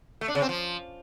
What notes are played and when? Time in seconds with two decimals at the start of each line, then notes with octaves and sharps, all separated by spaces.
0.21 A3
0.28 D4
0.35 C#3
0.42 C4
0.49 F3